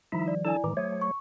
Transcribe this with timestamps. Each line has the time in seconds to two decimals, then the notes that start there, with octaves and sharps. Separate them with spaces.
0.12 D#3 F3 G3 D#4 E4 E5
0.28 D5
0.45 D4 E4 A4 D5 G#5 A5
0.64 A2 D#3 E3 G#3 D#4 D6
0.77 F#3 A3 C5 C#5 D#6
1.02 C#6